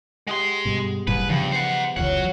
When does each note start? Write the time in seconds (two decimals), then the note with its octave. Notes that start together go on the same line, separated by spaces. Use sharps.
0.27 G#3 G4 G#4 F#5 C6
0.65 G2 B2
1.07 F#1 C2 A2 C3 G3 B4
1.29 G2 C#3 E3 F3 B3
1.52 C5 F#5
1.97 F1 C#2 E3 F#3 F4 C#5 F#5